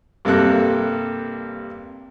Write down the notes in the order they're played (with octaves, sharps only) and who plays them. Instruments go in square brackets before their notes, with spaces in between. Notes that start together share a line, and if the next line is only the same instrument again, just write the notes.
[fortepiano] G2 C3 A#3 A4 F#6